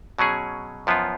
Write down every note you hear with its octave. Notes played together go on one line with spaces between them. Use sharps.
B2 F#3 C#4 G#4
F#2 F3 B3 F4